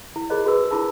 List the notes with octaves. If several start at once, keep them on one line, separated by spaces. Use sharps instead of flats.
E4
F4 G#4 A#4 C5 C#5 D#5
F#4 G#4 B4 E6
D4 E4 F4 G#4 A5 E6